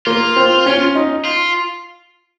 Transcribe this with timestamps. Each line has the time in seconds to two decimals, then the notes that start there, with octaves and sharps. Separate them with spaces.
0.06 A#3 F4
0.36 C4
0.66 C#4
0.95 D#4
1.25 F4